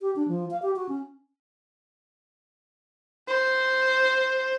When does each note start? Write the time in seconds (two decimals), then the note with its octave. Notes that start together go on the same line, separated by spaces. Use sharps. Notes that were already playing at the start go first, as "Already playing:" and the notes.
0.01 G4
0.16 D4
0.28 F3
0.51 F5
0.62 G4
0.76 F#4
0.89 C#4
3.28 C5